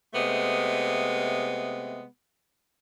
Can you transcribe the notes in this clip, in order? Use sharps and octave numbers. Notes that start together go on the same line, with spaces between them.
C3 G#3 A3 B3